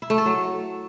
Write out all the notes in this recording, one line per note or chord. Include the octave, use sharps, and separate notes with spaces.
E4
A3
A4
F#3